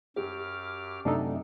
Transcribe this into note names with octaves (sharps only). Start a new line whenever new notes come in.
F#2 G4 D6 F6
F#2 C3 A3 D4 D#4 A4